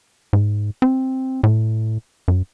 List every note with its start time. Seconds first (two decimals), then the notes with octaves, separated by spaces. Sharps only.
0.33 G#2
0.82 C4
1.43 A2
2.28 F#2